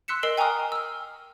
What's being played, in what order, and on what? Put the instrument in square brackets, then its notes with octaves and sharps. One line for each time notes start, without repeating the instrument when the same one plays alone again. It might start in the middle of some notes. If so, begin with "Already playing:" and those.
[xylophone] C6 E6 F#6 B6 C#7 E7
A#4 D#5 E6 C7 D7 F#7
G5 G#5 A#5 C#6 D#6 F6
E6 F6